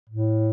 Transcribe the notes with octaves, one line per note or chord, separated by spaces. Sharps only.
A2